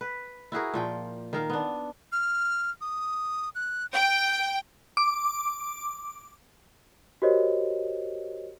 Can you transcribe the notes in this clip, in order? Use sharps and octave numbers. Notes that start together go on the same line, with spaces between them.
B4
E4 F#4 G#4 A#4
A#2 F3 G5
D#3 A#4 F5
B3 D4
F6
D#6
F#6
G5 G6
D6
F#4 G4 A#4 C5 C#5 D#5